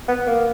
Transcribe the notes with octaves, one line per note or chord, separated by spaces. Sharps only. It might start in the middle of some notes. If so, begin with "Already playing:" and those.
B3
A#3